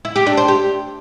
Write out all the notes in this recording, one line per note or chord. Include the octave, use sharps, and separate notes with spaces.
E4
G4
D4
C5
G4